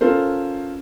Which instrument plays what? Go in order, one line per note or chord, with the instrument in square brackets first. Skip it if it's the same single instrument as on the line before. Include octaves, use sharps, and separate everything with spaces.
[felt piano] C#4 F4 A4 A#4 C5